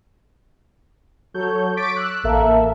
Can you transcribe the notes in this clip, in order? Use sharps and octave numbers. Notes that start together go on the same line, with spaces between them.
F#3 A4 C#5 G6
C#6 D6 A6 B6 D7
E6 F#6
A1 A#3 A4 A#4 E5